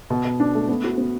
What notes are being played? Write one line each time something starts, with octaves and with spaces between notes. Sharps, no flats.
B2
B2
D4
A3
B3
F#4
B3